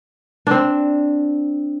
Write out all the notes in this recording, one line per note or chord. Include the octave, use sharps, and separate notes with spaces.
C4 D4